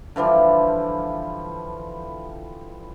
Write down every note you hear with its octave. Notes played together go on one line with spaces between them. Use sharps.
D3 E3 F3 G3